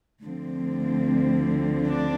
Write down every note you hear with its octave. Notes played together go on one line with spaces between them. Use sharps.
D2 D3 F3 C4
D4